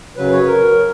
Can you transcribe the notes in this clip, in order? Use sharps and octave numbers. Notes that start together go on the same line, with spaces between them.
F#2 C#3 F#3 B4
C#5
A#4